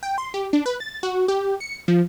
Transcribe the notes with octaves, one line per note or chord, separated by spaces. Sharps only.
G5
C6
G4
D4
B4
A6
F#4
G4
C#7
F3